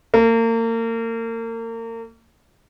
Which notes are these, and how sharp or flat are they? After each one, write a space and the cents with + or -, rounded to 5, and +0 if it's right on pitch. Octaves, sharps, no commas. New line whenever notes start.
A#3 -35